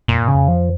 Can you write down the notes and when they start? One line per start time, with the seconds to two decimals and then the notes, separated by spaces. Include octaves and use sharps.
0.08 F2 A#2
0.22 G#2
0.28 C#3
0.34 F2
0.48 F3